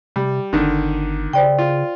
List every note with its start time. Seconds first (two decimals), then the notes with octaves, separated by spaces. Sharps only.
0.16 C3 G3
0.53 G1 D3 D#3
1.33 C#3 C5 D5 G5
1.58 F4